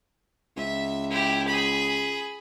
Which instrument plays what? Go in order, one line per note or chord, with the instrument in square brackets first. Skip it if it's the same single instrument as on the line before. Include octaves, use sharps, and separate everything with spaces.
[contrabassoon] C#2 [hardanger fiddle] E5
[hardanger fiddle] E4 G4
G#4 B5